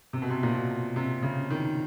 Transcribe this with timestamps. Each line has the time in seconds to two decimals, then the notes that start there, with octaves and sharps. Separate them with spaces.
0.13 C3
0.22 B2
0.30 C3
0.43 A#2
0.55 B2
0.96 C3
1.22 C#3
1.50 D#3